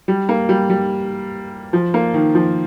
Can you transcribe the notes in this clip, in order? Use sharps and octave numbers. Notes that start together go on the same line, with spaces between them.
G3
A#3
G3
G3
F3
A#3
D#3
F3